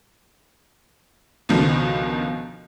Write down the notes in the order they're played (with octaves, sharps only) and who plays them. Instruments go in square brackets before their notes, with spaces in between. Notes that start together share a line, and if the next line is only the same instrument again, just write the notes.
[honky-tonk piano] C#2 B2 D3 D#3 F3